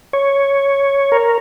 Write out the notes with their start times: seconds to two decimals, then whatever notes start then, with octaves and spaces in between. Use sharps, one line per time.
0.13 C#5
1.12 A#4